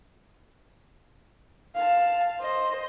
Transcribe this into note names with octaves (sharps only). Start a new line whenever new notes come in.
F5 A5
C5 D#5